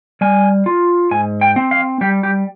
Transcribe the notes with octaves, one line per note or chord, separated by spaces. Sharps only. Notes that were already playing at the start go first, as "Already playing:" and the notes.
G3 G#5
F4
G#2 G#5
G5
C4
F5
G3 G4
G4